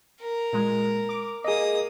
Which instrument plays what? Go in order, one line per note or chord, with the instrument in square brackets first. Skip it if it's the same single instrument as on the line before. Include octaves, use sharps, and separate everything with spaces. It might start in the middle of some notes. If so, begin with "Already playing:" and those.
[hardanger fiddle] A#4
[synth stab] A#2 G#3
D6
[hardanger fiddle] A#3 D#6 [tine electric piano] G#4 D#5